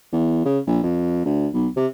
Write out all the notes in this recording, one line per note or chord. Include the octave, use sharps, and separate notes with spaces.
E2
C#3
A#1
F2
D2
B1
C3